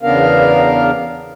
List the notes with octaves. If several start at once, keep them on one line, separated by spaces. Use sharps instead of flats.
E2 C#3 B3 D4 A#4 F5